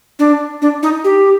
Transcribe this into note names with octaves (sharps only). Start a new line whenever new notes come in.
D4
D4
D#4
G4